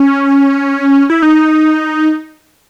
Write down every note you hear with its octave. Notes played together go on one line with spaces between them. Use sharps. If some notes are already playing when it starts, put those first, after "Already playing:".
Already playing: C#4
E4
D#4